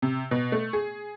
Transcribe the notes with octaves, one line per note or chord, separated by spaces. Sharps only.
C3
B2
A3
G#4